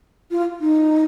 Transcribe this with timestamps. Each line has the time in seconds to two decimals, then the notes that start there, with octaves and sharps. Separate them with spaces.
0.31 F4
0.61 D#4